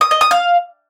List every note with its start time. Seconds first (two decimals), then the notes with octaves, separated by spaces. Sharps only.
0.01 D#6
0.11 D#5
0.21 D#6
0.31 F5